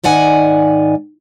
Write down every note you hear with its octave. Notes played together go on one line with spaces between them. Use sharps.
G#2 D#3 D5 F#5 G#5